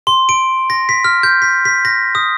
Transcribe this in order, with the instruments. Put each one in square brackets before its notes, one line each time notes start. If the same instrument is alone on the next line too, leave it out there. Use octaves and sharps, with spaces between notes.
[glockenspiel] C6
D7
A#6
B6
F6
G6
B6
B6
A#6
D#6